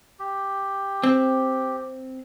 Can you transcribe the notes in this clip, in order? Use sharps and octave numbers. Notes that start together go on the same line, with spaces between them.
G4
C4